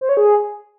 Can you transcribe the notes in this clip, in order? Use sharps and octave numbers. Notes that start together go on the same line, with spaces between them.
C5
C#5
G#4